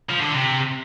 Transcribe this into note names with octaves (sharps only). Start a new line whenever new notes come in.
F3
D3
C3